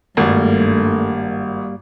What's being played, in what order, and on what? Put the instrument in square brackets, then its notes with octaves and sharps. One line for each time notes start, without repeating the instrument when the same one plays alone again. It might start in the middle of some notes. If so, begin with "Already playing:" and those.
[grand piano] G#1 [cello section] G2 [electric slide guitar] G3 A#3 [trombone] A3